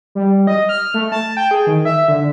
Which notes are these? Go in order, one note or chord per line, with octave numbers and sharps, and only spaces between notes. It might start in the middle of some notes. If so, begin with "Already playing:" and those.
G3
D#5
F6
A3
A5
G5
G#4
D#3
E5
D3